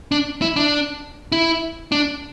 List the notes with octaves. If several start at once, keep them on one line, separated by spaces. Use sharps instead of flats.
D4
E4
D4
E4
D4